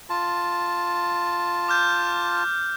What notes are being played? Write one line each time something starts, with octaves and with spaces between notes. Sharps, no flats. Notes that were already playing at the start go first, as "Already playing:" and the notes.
F4 A5
D6 F6 G6